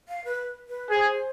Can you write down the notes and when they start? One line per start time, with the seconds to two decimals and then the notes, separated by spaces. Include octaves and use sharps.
0.09 F5
0.25 B4
0.68 B4
0.90 G#4 C5